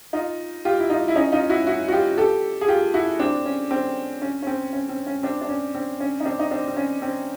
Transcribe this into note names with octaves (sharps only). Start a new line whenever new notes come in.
D#4 F4
F4 G4
E4
D#4 F4
E4
C#4 D#4
D#4 F4
E4 F#4
E4 F#4
F#4
F4 G4
G4 A4
G#4
F4 G4
E4 F#4
C4 D4
C#4
C4
C#4
C#4
C4
C#4
C4
C#4
C4 D4
D4
C#4
C4
C#4
D#4
C4 D4
D#4
C4 D4
C4
C#4
C4